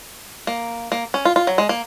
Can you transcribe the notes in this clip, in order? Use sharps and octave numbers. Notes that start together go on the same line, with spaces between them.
A#3
A#3
C#4
F4
F4
F#3
G#3
A#3